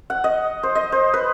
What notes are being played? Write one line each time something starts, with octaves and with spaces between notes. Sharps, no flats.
F#5
D#5
C5
D#5
C5
B4